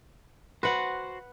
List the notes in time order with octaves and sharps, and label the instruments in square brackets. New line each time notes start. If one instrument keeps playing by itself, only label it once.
[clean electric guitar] F#4 C5 [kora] B4 F#5